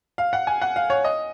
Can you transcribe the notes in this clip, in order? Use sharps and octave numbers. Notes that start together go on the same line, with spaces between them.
F5
F#5
G#5
F#5
F5
C#5
D#5